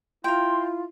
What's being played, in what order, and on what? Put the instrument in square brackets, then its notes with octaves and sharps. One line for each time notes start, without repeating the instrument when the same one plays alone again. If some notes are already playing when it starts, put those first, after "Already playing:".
[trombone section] E4 [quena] F4 [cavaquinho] A#4 G5 [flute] C6